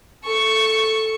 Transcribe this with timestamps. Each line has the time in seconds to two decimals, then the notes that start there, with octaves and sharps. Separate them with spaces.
0.25 A4 C#6